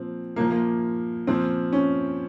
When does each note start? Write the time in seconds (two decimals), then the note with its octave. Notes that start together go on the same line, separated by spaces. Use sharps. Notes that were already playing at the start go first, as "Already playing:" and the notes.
Already playing: A#2 F3 C4
0.36 A#2 F3 A#3
0.50 A#3
1.27 A#2 F3 C4
1.73 C#4